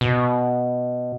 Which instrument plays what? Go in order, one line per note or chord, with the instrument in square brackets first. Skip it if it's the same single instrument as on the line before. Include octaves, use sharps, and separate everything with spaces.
[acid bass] B2